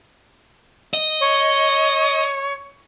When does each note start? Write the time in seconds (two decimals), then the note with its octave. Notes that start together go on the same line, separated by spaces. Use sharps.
0.94 D#5
1.20 C#5